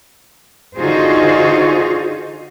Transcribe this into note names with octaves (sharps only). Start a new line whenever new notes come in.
D3 D#4 F4 F#4 G#4 C5